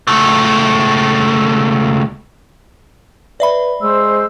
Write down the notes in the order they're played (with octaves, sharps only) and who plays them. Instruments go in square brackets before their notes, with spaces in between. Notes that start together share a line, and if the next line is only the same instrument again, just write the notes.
[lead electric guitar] C#2 A3
[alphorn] B4 [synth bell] D5 E5 B5
[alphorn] G#3 [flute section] C5 [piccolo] E6